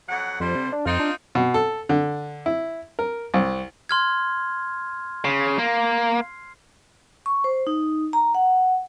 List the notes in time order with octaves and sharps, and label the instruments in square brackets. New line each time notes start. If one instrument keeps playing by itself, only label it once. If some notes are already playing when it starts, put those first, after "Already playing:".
[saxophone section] F2 F#3 F#5
[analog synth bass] F2 [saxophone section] D3 G3 C5
[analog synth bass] C3
D4
[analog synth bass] F2 [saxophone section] C4 D#4 F4
[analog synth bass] D4
[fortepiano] B2
A4
D3
E4
A#4
C2
[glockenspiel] C6 F6 G#6
[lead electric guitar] C#3 [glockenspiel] C7
[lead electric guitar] A#3
[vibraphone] C#6
C5
D#4
A#5
F#5